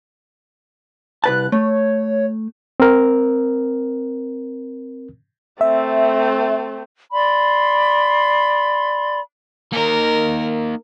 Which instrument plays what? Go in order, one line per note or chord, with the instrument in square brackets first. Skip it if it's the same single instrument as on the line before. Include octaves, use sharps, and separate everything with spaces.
[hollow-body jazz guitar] C2 B4 A5 [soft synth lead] F#6
[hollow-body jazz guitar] A3 [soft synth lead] C#5
[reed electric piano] C4 A#4
[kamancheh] A3 C4 [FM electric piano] E5
[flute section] D5 B5 C6
[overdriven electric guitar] A#3 D#4 [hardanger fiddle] A#4